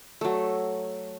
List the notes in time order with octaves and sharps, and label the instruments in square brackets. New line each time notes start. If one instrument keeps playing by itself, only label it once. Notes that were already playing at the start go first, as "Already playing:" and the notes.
[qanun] F#3 A3